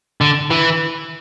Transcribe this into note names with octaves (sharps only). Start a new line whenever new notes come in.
D3
E3